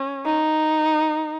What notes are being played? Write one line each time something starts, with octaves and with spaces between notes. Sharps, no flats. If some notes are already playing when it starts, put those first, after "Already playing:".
Already playing: C#4
D#4